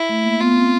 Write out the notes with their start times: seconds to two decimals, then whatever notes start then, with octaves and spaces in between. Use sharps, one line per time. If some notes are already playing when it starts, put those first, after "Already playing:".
Already playing: E4
0.09 A3
0.25 A#3
0.41 B3 F4
0.56 C4